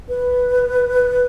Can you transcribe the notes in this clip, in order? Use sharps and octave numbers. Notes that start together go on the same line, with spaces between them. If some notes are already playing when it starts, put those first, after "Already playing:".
B4